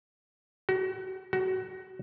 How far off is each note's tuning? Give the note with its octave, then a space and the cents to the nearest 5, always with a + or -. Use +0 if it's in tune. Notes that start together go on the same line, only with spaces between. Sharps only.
F#4 +35
F#4 +25